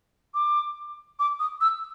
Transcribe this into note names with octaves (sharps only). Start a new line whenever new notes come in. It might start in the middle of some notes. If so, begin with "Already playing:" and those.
D6
D6
D#6
E6